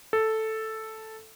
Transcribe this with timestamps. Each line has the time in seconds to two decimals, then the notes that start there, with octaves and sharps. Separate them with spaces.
0.13 A4